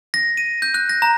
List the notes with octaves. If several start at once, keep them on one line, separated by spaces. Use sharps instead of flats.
A#6
D#7
G6
F#6
A#6
A#5